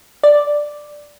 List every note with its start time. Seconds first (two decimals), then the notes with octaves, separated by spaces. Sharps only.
0.24 D5